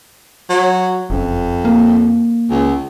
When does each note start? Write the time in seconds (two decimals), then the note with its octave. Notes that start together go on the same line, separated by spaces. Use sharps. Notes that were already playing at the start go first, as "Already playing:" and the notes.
0.50 F#3
1.10 F#1 F2
1.65 A#3
2.50 C#2